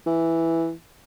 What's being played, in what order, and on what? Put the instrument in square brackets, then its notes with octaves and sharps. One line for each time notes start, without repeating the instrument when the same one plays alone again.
[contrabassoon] E3